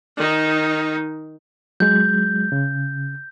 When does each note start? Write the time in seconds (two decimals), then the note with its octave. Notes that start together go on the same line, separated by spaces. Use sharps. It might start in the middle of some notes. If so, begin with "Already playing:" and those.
0.17 D#3 D#4
1.80 F#3 G#3 G6
2.52 C#3